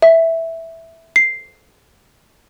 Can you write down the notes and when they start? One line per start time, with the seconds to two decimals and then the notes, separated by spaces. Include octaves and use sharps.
0.02 E5
1.16 C7